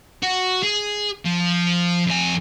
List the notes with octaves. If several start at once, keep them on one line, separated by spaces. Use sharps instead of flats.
F#4
G#4
F3
F2 G#5